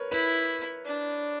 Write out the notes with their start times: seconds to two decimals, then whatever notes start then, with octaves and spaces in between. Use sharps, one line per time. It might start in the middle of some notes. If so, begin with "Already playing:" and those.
Already playing: A#4 B4 C#5
0.12 E4 B4
0.85 D4